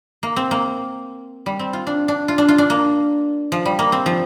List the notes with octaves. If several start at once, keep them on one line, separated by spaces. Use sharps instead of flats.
A#3
C4
A#3
G3
C4
F4
D4
D4
F4
D4
F4
D4
A#3
F3
G3
A#3
C4
F3